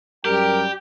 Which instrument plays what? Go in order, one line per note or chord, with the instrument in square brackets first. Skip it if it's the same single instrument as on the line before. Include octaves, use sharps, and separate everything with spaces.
[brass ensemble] F#2 G3 G5 [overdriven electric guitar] G4 [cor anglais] A#4